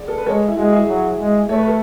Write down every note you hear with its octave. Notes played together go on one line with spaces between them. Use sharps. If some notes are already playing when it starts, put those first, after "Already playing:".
Already playing: G#4 D5
A4
B4
G#3 A4 C#5
E4
G#3 F#4
E4 G#4
F#3
G#3
A3 C#5
B4
A4